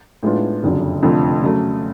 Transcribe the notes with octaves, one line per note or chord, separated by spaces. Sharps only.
A2 G#3 B3 D4 F4
F#1 F2 D3 F#3
F1 F2 D3 F3 A3
C#3 F#3 A3